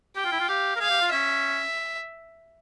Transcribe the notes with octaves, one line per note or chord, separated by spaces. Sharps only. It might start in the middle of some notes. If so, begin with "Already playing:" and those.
G4 G5
F4
E4
F4
G4 F5
A#4
G#4 F5
G4
F4
C#4 E5